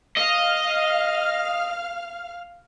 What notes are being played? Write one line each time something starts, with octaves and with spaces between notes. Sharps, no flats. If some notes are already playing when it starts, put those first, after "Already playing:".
D#5 F5 F6